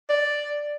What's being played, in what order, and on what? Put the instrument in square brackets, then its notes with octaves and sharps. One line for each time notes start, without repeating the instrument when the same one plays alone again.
[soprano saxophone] D5